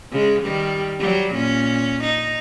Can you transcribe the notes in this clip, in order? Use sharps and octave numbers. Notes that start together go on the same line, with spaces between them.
C#3 G#3
D#3 G3
F#3 G3
A#2 C#4
D#4